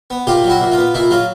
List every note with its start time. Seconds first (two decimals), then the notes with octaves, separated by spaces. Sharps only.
0.10 B3
0.27 A#2 F4 G4
0.44 F#3
0.49 E4 F#4
0.61 A#2
0.72 F4
0.78 B3
0.94 A#2 E4
1.11 F#3 F4